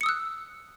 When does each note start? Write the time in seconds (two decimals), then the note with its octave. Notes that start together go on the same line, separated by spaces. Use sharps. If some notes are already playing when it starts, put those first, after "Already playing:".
0.01 C#7
0.03 D#6
0.06 E6
0.09 F#6